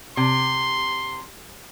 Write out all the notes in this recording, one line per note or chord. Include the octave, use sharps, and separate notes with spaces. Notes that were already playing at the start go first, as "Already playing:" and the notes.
C3 C6